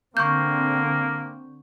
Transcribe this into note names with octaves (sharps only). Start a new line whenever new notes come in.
D3 A#3 C4 C#6 G6